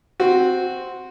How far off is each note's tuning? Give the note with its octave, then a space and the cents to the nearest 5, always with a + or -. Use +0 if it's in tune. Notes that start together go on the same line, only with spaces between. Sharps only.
C4 +0 F#4 -10